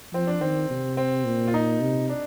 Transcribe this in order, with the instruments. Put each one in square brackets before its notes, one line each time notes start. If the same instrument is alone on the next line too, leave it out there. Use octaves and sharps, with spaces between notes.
[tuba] F3 [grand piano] C4
[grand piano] D4
[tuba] D#3 [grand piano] C4
[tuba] C3
[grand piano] C4
[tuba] A#2
[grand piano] F4
D#4
[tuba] C3
[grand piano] D4